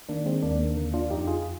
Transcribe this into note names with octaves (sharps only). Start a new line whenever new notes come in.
D#3 A#3 D4
G#3 C4
D#2 A#3 D4
A#3
D3 A#3
D4 F4
F2 D#4 G4
F4 G#4